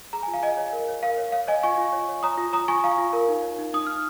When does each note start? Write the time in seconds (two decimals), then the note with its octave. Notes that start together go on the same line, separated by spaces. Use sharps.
0.13 G#4 A#5
0.23 G#5
0.28 F4
0.34 F5
0.42 F4 D#5 G#5
0.57 C#5
0.73 A#4
0.88 C#5
1.03 A#4 F5
1.18 C#5
1.32 C#5 F5
1.47 C#5 D#5 G#5
1.63 F4 G#5 C#6
1.78 F4
1.93 C#5
2.09 C#5
2.23 C#5 A#5 D#6
2.38 F4
2.53 C#5 A#5 D#6
2.68 F4 G#5 C#6
2.83 F4 F5 A#5
2.98 F4
3.13 A#4
3.29 D#4
3.43 C#5
3.59 D#4
3.74 D#4 D#6
3.86 D#4 F6